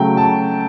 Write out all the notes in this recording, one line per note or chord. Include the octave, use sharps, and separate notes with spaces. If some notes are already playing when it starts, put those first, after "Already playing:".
Already playing: C#3 F#3 A3 G5
A5